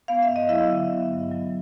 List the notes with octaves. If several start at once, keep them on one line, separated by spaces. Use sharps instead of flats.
B3 F5
E5
G2
D#5
F#3 E4 E5
D3
B3
G2
F#3